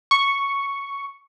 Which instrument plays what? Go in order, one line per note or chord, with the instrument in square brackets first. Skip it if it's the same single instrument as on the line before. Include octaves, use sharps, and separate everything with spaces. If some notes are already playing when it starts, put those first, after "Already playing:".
[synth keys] C#6